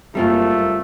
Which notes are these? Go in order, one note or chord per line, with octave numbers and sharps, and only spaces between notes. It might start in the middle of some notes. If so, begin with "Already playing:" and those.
F#1 F#2 G3 A3 A#3 C4 F4